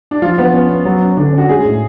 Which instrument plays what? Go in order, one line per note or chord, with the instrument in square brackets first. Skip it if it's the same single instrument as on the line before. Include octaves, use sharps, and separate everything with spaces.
[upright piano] D4
[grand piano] F3 [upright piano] F4
[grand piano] F3 [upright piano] B3
[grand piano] B3 [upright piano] C#4
[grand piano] B3
F#3
C#4
[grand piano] D3 [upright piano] D4
[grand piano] C#4 [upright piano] F#4
[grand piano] G#3 [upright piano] G#4
[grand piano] A2